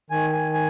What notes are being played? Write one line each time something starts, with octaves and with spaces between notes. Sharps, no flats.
D#3 G#5
G#5
G#5